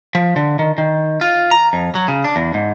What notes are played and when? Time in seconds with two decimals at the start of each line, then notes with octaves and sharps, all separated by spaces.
0.15 F3
0.36 D3
0.59 D#3
0.78 D#3
1.21 F4
1.51 A#5
1.73 F2
1.95 F#3
2.08 C#3
2.24 D4
2.36 E2
2.54 G#2